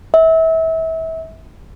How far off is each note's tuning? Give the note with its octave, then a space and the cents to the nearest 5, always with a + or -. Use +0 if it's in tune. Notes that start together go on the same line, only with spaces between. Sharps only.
E5 -30